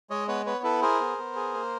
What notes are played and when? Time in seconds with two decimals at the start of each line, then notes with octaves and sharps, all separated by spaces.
0.10 G#3 C#5 D#5
0.28 B3 B4 C#5
0.46 B3 B4 C#5
0.63 E4 A4 B4
0.82 G#4 A#4 C5
1.00 B3
1.18 B3
1.36 G#4
1.54 A#3